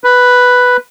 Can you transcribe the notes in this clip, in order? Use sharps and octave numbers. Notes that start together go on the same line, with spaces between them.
B4